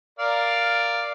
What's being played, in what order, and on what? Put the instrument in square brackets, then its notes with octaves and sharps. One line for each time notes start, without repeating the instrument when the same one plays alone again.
[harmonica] A#4 D5 F5